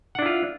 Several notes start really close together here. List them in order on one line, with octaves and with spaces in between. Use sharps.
F#5 D4 E4 F4